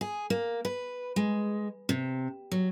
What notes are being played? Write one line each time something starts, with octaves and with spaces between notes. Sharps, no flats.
G#4
A#3
B4
G#3
C3
F#3